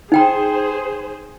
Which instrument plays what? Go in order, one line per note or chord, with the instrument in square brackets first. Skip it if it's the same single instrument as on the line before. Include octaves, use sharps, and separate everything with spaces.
[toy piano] D#4 G5 A#5 [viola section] G#4 C5